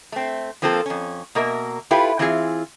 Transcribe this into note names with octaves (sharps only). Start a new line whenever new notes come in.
A3 C4
F3 A#3 C4 F4 A4
F2 C#4
B2 A#3 A#4 E5
E4 F4 G4 A4 B4
E3 C4 E4 F4 G#4